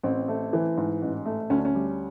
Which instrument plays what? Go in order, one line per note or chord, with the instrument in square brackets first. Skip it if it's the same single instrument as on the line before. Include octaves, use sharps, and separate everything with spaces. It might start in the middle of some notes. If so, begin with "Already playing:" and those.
[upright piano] A1 C4
A3
E3
G#2
A1
A3
D2 C#4
D4
C#4
G3